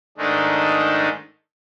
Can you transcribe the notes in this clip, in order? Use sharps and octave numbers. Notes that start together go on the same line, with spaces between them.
G#2 D#3 G#3 A3 D4 D#4